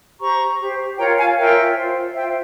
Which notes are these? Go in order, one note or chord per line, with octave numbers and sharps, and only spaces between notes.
G4 C5 A#5 C#6
G4 C5
F4 A#4 C#5 G5 A#5
F5 G#5
F4 A#4 C#5 E5 G5
F4 C5
F4 C5 E5 G5